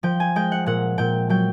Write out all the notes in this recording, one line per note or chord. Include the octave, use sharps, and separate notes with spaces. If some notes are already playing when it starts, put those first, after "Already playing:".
F3 G5
G#5
G#3 G5
F#5
A#2 F#5
A#2 G5
F#3 G5